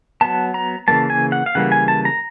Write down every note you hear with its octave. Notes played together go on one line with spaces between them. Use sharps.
F#3 B3 A5
A#5
C#3 E3 G3 A#3 A5
G#5
F#5
F5
C#3 E3 G3 A#3 F#5
G#5
A5
A#5